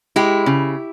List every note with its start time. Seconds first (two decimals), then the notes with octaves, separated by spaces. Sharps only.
0.16 G#3 E4 G4
0.46 C#3